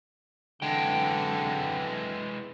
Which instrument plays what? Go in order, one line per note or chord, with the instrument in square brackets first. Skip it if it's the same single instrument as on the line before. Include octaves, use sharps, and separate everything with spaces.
[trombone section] F#2 C4 B4 [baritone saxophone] D3 [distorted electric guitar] E3 G#3 [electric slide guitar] G5